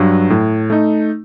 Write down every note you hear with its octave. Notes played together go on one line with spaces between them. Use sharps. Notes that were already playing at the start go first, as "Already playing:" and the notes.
Already playing: G2 F#3
A2
A3 D#4